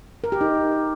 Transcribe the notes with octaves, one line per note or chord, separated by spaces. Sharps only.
A#4
G4
D#4